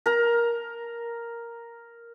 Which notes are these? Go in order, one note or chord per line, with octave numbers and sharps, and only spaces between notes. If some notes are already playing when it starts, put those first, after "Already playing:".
A#4 A#5